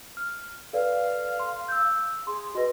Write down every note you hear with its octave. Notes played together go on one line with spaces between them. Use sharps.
F6
A4 B4 D5 F5
C6
E6 G6
G#4 C6
F#4 B4 D#5